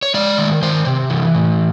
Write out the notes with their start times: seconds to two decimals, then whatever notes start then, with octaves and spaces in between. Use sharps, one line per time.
0.03 C#5
0.14 G#3 D5
0.38 D#3
0.62 D#3 C5
0.86 C3
1.10 E3
1.35 A2